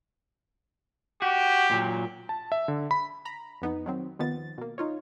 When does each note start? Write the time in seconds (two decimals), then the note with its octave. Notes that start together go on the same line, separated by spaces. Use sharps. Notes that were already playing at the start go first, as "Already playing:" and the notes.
1.22 F#4 G4
1.71 A#2 F#3
2.29 A5
2.52 E5
2.68 D3
2.91 B5
3.25 A#5 B5
3.62 F2 B3 D#4
3.86 D#3 F#3 C4
4.19 D#2 D#3 F3 B3 A6
4.58 B2 A#3
4.78 D#4 F4 C#5